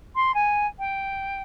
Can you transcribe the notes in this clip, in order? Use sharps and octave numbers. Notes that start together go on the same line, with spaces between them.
C6
G#5
G5